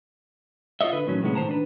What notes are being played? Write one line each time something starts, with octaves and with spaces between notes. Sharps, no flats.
F4 B4 C#5 D#5 E5
D3 B4
A2 D#3 F#3 C#4
A2 C3 G#3 B3 C#4
A2 D#3 C5 A5 A#5
D4 B4